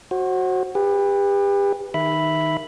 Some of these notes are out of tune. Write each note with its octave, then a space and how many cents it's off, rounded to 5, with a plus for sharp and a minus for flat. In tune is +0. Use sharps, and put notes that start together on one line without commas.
F#4 +0 C5 +35
G4 +35 B4 +0
D#3 +0 E5 +0 B5 +0